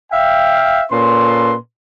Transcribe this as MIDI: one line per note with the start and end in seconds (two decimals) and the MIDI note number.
0.11 0.82 76
0.11 0.82 77
0.11 0.82 79
0.90 1.54 46
0.90 1.54 61
0.90 1.54 69
0.90 1.54 71
0.90 1.54 84